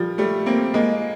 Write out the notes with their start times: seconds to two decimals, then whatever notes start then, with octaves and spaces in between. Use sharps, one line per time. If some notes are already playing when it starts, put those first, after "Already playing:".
Already playing: F3 G3
0.18 G3 A3
0.46 A#3 C4
0.74 G#3 A#3